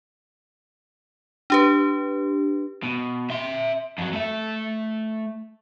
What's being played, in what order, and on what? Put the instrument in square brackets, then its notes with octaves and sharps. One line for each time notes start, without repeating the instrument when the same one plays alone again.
[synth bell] D4 G4 B4
[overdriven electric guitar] B2
E5 C6
F2 F#3
A3 E5